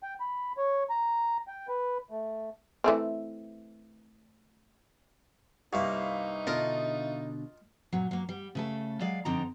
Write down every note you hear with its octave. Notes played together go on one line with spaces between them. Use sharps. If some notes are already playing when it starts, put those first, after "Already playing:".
G5
B5
C#5
A#5
G5
B4
A3
E3 A3 C4
C2 G2 A#3 D#4 E5 F5 C#6
B2 D3 D4 F4 A#4 D#5
A#2 F#3
F#3 A#3
G3
C#3 A3 A4
F#3 G#3 D5 F5
F2 D3 C4 D#4 D5 A#5